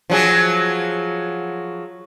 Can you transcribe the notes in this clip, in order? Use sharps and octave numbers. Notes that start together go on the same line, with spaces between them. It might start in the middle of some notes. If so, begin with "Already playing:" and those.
F3 F#3 G#4